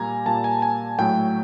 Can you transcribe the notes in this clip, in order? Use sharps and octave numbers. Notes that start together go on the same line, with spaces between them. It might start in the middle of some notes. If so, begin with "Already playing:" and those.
Already playing: A#2 G3 A#3 G#5 A#5
A#2 G3 A#3 A5
G#5
G#5
A2 F#3 A3 G5